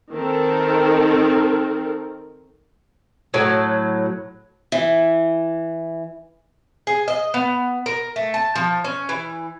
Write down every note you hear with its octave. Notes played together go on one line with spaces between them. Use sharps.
D#3 C4 A4 A#4
A2 F#3
E3
G#4
D#5
B3
A#4
A3
A5
F3
C#4
E3